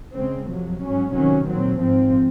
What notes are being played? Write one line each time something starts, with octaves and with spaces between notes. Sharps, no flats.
C#3 G#3 C4
F2 C3 F#3
G#2 F#3 C#4
C3 D#3 F#3 C#4
A#2 F#3 C4
G#2 F3 C4